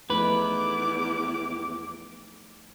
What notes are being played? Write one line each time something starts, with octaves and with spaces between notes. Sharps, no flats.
E2 F3 A3 D#4 B4 D6